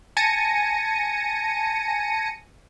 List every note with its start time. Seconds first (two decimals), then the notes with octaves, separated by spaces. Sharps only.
0.17 G#5 A5 A#6 C#7 D#7